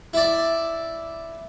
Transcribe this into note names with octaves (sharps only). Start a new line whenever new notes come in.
E4 D5